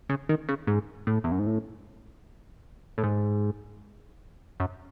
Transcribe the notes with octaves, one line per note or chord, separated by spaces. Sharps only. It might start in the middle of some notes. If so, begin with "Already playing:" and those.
C#3
D#3
C#3
G#2
A2
E2
F#2
G#2
A2
A2
G#2
F#2